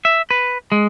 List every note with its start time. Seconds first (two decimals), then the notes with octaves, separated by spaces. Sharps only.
0.05 E5
0.31 B4
0.72 G#3